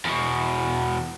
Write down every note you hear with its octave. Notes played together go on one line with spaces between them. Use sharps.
E2 B2